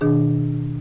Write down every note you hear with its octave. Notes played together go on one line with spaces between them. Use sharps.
B2 D#3 D4 G#4